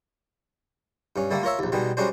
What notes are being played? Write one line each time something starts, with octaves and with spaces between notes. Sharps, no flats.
G2 C#4
D3 G3 A3 A#3
F4 A#4 C#5 E5
A#1 D#2
B2 D#3 G3 G#3
G3 G#3 C#4 D4 F#4 C5